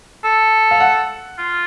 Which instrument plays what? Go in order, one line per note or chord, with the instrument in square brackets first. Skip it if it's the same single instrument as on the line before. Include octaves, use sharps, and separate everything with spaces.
[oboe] A4
[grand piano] F5
F#5
[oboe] F4